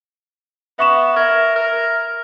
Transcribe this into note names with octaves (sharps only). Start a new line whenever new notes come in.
B3 E5 C#6 E7
A#4 E5 G#6
A#4